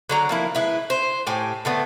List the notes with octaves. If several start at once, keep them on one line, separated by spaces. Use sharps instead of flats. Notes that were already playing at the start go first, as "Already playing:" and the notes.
D3 F#3 A#5
F3 A#3 E4
G#3 E4 B4
C5
A2 G4 G#5
D3 A3 B3